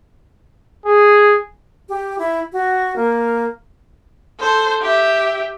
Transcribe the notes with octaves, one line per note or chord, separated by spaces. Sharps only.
G#4
G4
E4
F#4
A#3
A4 C5
G4 E5